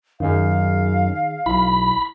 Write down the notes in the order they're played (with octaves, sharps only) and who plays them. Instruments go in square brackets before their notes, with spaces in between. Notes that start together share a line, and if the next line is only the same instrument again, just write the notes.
[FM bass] F#2 [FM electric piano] D#3 D#4 G#4 [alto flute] F5
[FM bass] B1 [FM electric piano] E4 [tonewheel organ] B5